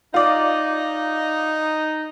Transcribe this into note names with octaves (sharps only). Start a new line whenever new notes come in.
D#4 F4 D5